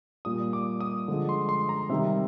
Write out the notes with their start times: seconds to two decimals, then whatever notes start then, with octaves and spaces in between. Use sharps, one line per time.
0.25 A#2 G3 D#6
0.53 D6
0.81 D#6
1.08 D3 F3 G#3
1.29 C6
1.49 C6
1.69 A#5
1.89 C3 D#3 G3 E5